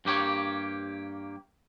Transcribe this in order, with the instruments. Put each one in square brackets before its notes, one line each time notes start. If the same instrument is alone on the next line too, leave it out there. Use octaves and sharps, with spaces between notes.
[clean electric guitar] G2 A#3 G4 C#5